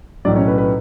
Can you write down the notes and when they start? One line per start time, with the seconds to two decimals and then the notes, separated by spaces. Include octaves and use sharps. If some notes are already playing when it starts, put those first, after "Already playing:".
0.25 B1 A2 F#3 D4 D5
0.36 C#4 C#5
0.48 B4
0.58 B4